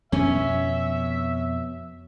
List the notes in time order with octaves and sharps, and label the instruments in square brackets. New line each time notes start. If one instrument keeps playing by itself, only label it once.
[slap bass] F2 B2 B3 [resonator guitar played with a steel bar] C#4 [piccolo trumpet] E5